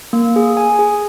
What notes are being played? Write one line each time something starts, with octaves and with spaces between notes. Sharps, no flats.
A#3
G#4
G#5
G#4